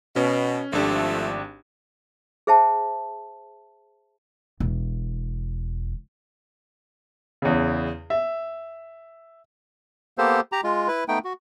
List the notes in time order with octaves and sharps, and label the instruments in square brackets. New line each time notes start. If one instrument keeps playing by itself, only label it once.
[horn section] B2 [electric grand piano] C#4
[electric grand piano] G#1 D4 G4 [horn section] F3 A3
[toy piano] G#4 C5 E5 G5 A5
[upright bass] E1
[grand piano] E2 C#3
E5
[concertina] A#3 B3 G4 A4 C5
G4 A#5
G#3 F4
E4 B4
A3 B3 D#4 G5
F#4